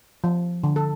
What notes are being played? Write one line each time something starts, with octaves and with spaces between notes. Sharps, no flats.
F3
D3
A4